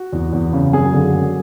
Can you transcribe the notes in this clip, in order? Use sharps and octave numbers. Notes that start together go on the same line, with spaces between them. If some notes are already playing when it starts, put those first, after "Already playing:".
Already playing: F#4
E2
E2
C#3
F#2 G#4
D3
F#2